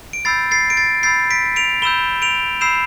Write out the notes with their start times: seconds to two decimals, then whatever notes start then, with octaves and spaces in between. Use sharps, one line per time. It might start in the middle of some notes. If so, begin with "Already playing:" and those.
0.13 D7
0.25 B5 E6 G6 A6 C7
0.51 A6 C7
0.70 D7
0.77 A6 C7
1.03 B5 E6 G6 A6 C7
1.31 B6 D7
1.56 D7 F7
1.82 B5 E6 G6 E7 G7
2.22 D7 F7
2.61 B5 E6 G6 C7 E7